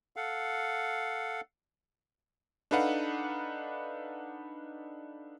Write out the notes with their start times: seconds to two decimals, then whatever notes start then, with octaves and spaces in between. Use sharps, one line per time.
0.16 A4 F5 F#5
2.71 D4 D#4 A4 B4 F5 F#5